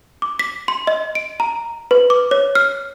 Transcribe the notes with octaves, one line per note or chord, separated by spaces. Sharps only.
D6
B6
C6
D#5
D7
A#5
B4
D6
C#5
F6